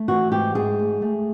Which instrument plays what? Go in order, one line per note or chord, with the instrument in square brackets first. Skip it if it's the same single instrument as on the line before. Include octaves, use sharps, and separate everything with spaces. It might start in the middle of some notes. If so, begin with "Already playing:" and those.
Already playing: [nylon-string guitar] A3
E3 F#4
G#2 G4
G#2 G#4
A3
A3